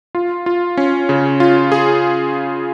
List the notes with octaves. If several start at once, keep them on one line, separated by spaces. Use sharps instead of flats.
F4
F4
C#4
C#3
F4
G#4